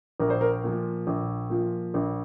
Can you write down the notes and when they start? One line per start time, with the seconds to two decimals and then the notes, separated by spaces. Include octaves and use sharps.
0.20 A#1 A#4
0.30 C5
0.41 A#4
0.64 A#2 F3
1.07 A#1
1.50 A#2 F3
1.94 A#1